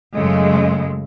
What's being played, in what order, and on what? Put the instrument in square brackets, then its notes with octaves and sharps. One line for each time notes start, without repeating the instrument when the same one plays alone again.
[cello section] F#2 C#3 G#3 A3